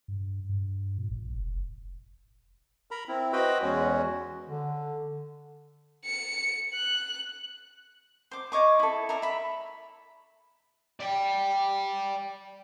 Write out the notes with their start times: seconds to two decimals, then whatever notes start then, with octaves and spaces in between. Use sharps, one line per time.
0.08 G2
0.49 G2
0.98 A#2
1.10 A1
1.34 F1
2.91 A#4 A#5 B5
3.08 C4 E4
3.32 F#4 B4 C5 D#5 G5 B5
3.62 E2 G#3 C#4 F#4
4.48 D3
6.06 C#7
6.74 F#6
8.31 C5 D6
8.52 C#5 D#5 C#6 D6
8.80 E4 A4
9.09 D5 E5 A#5
9.22 E5 B5
11.00 D5 G5